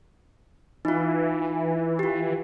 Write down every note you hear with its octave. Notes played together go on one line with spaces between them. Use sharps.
E3 D#4 F4
F4 G4